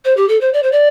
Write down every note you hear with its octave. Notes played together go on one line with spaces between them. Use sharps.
C5
G4
A4
C5
D5
C5
D5